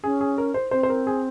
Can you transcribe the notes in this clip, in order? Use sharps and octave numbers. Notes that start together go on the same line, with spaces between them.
C#4 G#4
G#4
A#4
C5
C4 C5
C5
A#4
G#4